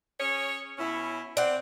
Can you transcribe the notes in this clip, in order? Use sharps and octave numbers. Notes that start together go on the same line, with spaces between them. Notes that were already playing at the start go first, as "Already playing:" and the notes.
C#4 G#4 C#5
B2 C#4 E4
C4 D5 F#5